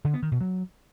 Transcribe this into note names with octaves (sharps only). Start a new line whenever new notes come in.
D3
B3
D#3
B2
F#3